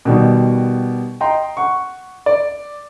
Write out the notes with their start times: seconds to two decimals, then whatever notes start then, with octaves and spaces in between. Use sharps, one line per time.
0.05 B2 D#3 G3
1.21 D#5 G5 A#5 C6
1.57 F#5 C#6
2.26 D5